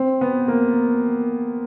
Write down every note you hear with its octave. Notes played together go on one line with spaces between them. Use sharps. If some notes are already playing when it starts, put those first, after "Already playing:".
Already playing: C4
B3
A#3